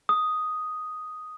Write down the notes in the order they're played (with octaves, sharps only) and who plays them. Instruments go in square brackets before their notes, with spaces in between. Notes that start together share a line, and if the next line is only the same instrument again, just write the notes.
[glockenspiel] D#6